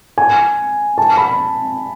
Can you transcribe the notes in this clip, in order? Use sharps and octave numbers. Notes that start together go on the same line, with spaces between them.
G#5
A5
B5